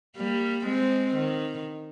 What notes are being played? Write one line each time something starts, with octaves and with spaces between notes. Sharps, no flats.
G3 A#3
G#3 C4
D#3